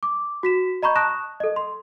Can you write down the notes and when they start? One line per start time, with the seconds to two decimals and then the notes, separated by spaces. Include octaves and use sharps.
0.03 D6
0.43 F#4 B6 E7
0.83 D#5 A#5 B5 C#6 G6
0.95 A5 C#6 D#6 F#6 A#6 E7
1.40 A4 D#5
1.56 C6